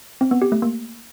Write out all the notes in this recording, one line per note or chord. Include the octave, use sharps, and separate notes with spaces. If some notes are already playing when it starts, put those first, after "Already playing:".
C4
B3
G4
A3
A#3